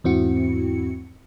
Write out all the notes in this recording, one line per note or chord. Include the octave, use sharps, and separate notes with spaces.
E2 G#2 C4 E4 F#4 C#7